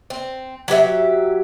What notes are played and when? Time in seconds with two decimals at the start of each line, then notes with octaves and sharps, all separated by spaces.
0.10 C4
0.68 F#3 G4 B4 E5